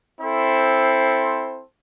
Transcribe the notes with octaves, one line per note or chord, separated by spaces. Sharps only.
C4 E4 A4 C5